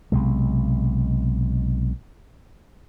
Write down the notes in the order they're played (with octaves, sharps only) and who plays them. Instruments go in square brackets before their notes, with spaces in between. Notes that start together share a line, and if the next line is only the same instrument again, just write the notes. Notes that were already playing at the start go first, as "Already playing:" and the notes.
[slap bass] B1 C3 G#3